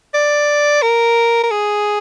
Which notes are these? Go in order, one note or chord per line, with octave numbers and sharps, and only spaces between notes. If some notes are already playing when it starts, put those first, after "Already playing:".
D5
A#4
A#4
G#4